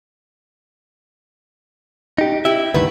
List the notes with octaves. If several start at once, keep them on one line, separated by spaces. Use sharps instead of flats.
D#4 G4
E4 G4 E5
D2 G2 D#3 B4